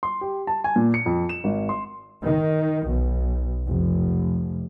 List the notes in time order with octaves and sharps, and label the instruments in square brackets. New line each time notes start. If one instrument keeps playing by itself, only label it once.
[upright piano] C6
G4
A5
G#5
A#2
C#7
F2
E7
G#1
C6
[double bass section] D#3
B1
F1